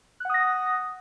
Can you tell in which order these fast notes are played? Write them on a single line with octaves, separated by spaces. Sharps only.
F#6 F#5 D#6 A#6